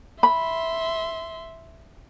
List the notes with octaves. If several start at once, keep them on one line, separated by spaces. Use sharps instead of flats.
E5 B5 C6